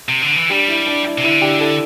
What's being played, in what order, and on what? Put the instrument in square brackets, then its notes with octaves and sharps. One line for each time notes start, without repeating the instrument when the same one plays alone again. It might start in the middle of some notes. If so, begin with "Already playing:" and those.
[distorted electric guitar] C3
D3
E3
[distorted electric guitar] G3 [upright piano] D4 G4
[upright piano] E4
D4
E4
[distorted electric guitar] C3
[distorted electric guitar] D3 [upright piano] E4
[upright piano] D4 G4
E4 A4